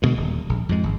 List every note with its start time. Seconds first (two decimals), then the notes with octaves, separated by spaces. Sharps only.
0.02 G2 B2 D3 G#3
0.17 D#1
0.49 A#1
0.69 F2 G#2 G#3
0.83 G#1